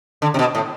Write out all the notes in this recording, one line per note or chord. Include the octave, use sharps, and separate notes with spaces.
D3
C3
B2
A2